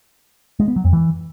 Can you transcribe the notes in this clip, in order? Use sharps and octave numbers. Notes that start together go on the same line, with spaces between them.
G#3
B3
F#3
F2
E3